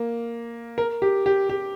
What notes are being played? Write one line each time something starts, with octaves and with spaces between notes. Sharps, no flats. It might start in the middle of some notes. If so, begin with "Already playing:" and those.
Already playing: A#3
A#4
G4
G4
G4